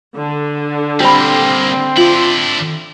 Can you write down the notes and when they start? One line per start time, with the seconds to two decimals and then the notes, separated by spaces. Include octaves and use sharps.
0.17 D3
1.00 G3 A#3 C4 G4 B5
1.97 D3 E4 F4